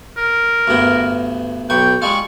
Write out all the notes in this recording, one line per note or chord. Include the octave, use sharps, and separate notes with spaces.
A#4
D2 G2 B3
B1 B4 G5 C#6
G3 G#3 F4 C#6